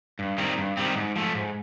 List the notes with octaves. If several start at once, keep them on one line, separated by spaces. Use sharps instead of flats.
G2
D#3 G3 C4
G2
D#3 G3 C4
G#2
F3 A3
G#2